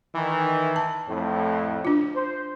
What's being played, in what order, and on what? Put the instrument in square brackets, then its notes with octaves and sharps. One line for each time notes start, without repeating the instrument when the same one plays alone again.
[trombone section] D#3 E3
[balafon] A5
[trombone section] F2 A2
[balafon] D4 F4
[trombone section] C5